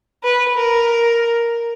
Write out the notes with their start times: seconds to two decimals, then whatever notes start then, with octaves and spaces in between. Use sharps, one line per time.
0.23 B4
0.56 A#4